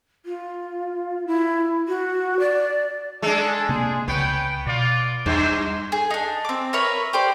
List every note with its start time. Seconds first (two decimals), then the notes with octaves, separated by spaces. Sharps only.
0.25 F4
1.27 E4
1.88 F#4
2.39 D5
3.22 G#3 D4 A4
3.69 C3 A#3 G#4 C5
4.08 C#2 C#3 B3 B4 C#5 G5
4.67 B2 F4 D5
5.26 E2 G2 C#4 F#4 C5
5.92 G#4
6.10 D4 D#4
6.45 C4 D6
6.73 A#4 B4 C#5 E5
7.13 G4 C5 D5